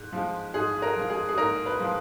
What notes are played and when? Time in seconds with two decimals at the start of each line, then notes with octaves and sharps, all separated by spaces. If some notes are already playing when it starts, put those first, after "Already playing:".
Already playing: G#2 G#3
0.13 F3 G#3
0.54 G#2 G#4
0.82 A#4
0.96 F3 G#3
1.10 G#4
1.29 G#4
1.38 G#2 A#4
1.66 B4
1.80 F3 G#3